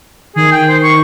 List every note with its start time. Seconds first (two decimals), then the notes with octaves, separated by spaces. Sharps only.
0.36 D#3 G#4
0.52 G5
0.69 C5
0.83 C#6